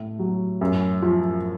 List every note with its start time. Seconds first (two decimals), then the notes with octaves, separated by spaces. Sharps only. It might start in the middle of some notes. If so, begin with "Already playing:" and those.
Already playing: A2
0.19 F#3
0.61 F#2
1.02 F3